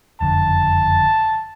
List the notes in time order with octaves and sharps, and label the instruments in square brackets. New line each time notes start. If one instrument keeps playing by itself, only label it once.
[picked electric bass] F#1 F2 D3 [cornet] A5